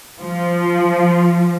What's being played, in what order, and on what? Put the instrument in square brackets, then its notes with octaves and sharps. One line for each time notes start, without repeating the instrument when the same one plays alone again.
[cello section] F3